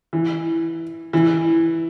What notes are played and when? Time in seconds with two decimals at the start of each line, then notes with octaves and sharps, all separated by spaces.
0.13 E3
1.13 E3